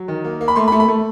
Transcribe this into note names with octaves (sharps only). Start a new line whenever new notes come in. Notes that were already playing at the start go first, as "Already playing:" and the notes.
Already playing: F#3
D#3
A#3
A#3
B5
A3 C6
B5
A3
B5
A3